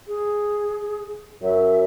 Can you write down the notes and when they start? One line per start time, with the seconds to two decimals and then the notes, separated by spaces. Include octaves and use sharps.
0.08 G#4
1.43 F#2 E5